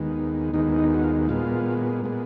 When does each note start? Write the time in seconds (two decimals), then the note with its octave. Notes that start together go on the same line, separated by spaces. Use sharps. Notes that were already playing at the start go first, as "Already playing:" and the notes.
Already playing: D#2 D#3 G#3 B3
0.53 D#2 D#3 G#3 B3 D#4
0.78 D#4
0.94 F#4
1.03 F4
1.29 A#2 G#3 B3 F4
2.04 A#2 G#3 B3